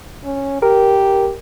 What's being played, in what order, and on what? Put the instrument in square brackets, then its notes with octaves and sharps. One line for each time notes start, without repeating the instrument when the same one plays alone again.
[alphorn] C#4
[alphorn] G4 [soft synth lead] A#4